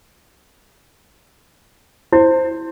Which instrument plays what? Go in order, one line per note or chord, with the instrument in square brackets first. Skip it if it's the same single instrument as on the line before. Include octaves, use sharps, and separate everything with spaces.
[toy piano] E4 [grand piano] C5